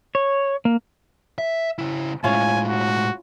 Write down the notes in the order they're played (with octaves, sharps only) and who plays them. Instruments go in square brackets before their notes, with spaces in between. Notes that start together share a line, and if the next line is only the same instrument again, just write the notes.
[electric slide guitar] C#5
A#3
[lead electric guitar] E5
C#3 E4
[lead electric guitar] A2 G#3 [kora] C#4 E4 F4 [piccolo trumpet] G#5
[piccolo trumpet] F#4